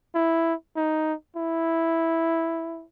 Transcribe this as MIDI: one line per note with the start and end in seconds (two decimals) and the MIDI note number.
0.15 0.54 64
0.76 1.13 63
1.36 2.84 64